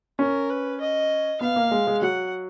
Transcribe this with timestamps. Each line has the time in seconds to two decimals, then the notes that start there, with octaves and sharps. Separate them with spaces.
0.19 C#4 A#4
0.49 B4
0.80 D#5
1.41 B3 F5
1.56 A#3
1.71 G#3
1.87 G#3
2.02 F#3 F#5